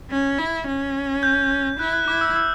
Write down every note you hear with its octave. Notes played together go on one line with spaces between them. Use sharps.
C#4
E4
C#4
G6
E4 F#6
F#6
E4 D6
E6
E6